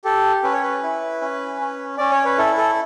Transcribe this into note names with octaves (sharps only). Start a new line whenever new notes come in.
G4 A4
C#4 B4
C#5
B4
E4
C#4
C#4
C#4 D5
C#5
B4
E4 A4
A4